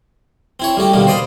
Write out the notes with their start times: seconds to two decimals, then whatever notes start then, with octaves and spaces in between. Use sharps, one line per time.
0.60 C4 E4 C#5
0.77 G3 A3 F#4 G4
0.93 B2 D3 D#3 G3 A#3
1.07 C5 D5 D#5 A#5 B5